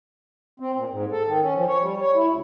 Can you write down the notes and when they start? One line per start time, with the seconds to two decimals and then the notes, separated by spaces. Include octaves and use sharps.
0.60 C4
0.76 A#2
0.90 G#2
1.12 A4
1.27 D#3
1.42 C#4
1.55 F3
1.68 C#5
1.81 G3
2.01 C#5
2.15 E4
2.29 D2